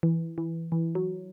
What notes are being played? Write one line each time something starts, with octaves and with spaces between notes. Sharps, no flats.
E3
E3
E3
F#3